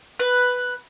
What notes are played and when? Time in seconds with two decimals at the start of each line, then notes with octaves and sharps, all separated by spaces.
0.20 B4